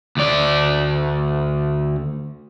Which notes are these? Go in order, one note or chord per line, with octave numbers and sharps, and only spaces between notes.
D2 D5